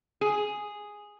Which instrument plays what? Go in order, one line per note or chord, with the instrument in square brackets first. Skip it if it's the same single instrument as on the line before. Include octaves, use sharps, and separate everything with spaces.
[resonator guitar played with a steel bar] G#4